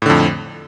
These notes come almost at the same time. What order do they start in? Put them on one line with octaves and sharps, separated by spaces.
A2 D3 F2